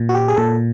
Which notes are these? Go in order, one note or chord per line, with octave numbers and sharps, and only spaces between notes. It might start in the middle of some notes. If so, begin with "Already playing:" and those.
Already playing: A#2
F#4
G4
G#4
A#2 A4